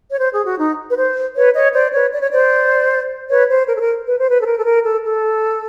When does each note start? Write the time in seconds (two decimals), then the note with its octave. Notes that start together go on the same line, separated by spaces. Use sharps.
0.09 C#5
0.19 C5
0.32 G#4
0.45 F#4
0.58 D#4
0.90 B4
0.96 C5
1.35 B4 C#5
1.54 C#5 D#5
1.74 C5 D5
1.93 B4 C#5
2.13 D5
2.21 C#5
2.31 C5 D5
3.29 B4 C#5
3.49 C5
3.68 A#4
3.76 A4
3.81 A#4
4.07 B4
4.18 C5
4.30 B4
4.41 A4
4.46 A#4
4.58 A4
4.65 A#4
4.84 A4
5.04 A4